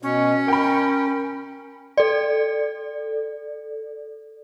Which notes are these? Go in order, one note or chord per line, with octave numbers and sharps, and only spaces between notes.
B2 C#4
A#4 G5 B5
A4 D5